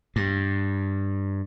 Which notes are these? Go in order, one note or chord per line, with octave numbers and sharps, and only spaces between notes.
G2